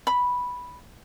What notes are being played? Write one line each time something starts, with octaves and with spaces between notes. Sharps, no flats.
B5